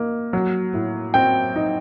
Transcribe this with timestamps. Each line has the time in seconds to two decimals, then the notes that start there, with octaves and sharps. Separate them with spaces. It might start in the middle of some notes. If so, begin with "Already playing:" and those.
Already playing: A#3 D#4
0.33 F#3
0.74 A2
1.14 C4 G5
1.56 D#4